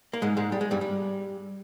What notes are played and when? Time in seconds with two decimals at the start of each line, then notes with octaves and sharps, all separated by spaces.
0.13 A#3
0.22 G#2 G#3
0.37 G#2 G#3
0.52 G3
0.61 G#3
0.71 G2 G3
0.81 G3